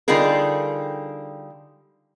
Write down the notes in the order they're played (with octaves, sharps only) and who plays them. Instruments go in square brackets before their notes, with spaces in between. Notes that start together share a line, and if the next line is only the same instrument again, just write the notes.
[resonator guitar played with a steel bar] D3 G3 D#4 F4 G#4 A#4